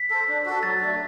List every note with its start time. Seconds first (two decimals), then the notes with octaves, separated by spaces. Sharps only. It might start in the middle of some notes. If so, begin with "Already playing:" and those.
Already playing: B6
0.10 A4 C5
0.28 D4
0.46 F#4 A4
0.63 F#3 A6
0.81 A3 D4